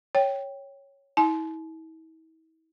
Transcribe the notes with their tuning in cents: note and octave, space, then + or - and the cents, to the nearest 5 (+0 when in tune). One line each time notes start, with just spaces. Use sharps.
C#5 +0 G5 +0
E4 -40 A5 -45